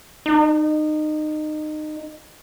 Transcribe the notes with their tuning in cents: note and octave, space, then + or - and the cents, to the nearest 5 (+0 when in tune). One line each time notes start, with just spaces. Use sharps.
D#4 -25